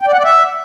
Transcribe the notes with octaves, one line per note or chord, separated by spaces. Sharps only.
G5
D5
F#5
D5
E5